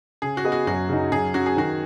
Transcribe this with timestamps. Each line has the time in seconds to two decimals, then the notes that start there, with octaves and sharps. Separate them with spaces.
0.22 C#3 G#4
0.37 F#4
0.45 B3 G#4 B4 D#5
0.52 F#4
0.67 F#2 F#4
0.89 C#3 F#3 D#4
1.12 F#2 G#4
1.34 F#3 C#4 F#4
1.46 G#4
1.57 D#3 F#4